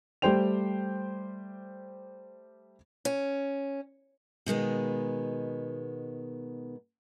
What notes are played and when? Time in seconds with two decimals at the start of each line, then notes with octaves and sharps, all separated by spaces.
0.22 G3 A3 G4 C5 G5 F7
3.05 C#4
4.46 B2 D#3 G#3 B3